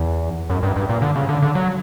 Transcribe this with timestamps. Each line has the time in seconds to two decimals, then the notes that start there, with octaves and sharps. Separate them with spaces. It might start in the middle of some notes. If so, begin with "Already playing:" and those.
Already playing: E2
0.50 F#2
0.63 G2
0.76 G2
0.89 A#2
1.02 D3
1.16 C#3
1.29 D3
1.42 D3
1.55 F#3